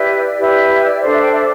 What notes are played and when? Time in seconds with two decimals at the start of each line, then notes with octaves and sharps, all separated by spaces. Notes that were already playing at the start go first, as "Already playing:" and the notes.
Already playing: E4 G4 B4 D5
0.39 E4 G4 B4
0.70 E5
0.85 D5
1.00 D4 A4 C5 D5
1.11 E5
1.22 G5
1.32 E5